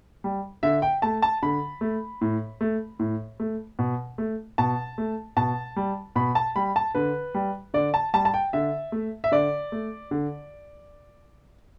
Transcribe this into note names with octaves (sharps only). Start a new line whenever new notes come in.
G3
D3 E5
G5
A3 A5
A5
D3 B5
A3
A2
A3
A2
A3
B2
A3
B2 A5
A3
B2 A5
G3
B2 B5
A5
G3 B5
A5
D3 B4
G3
D3 D5
A5
G3 A5
A5
G5
D3 E5
A3
E5
D3 D5
A3
D3